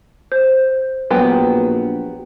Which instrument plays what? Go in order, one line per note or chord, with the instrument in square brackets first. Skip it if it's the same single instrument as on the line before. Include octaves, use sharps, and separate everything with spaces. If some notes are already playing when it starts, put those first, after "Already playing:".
[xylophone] C5
[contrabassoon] A#1 [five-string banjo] F#3 B3 G4